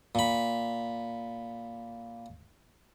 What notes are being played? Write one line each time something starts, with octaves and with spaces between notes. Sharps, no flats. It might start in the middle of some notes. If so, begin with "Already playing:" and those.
A#2 B5